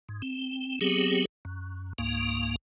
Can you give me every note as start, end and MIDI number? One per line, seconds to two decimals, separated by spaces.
0.09 0.22 44
0.22 0.79 60
0.81 1.25 54
0.81 1.25 59
0.81 1.25 60
0.81 1.25 67
0.81 1.25 68
1.45 1.93 42
1.98 2.56 37
1.98 2.56 44
1.98 2.56 58